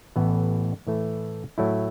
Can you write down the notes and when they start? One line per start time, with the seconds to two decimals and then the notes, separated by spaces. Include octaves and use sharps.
0.16 A1 A2 E3 B3
0.87 A2 E3 A3
1.58 A2 F#3 A3 E4